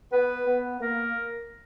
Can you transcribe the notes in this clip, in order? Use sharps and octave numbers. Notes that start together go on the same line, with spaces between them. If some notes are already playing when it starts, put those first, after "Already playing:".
B3 B4
B3
A#3 A#4